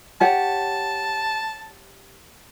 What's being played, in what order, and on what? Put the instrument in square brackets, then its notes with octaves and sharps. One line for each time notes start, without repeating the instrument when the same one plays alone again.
[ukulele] G4 C#5 F#5 [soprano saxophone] A5